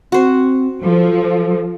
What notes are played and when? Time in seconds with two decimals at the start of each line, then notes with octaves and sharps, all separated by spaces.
0.12 C4 F#4 C5
0.84 F3 A4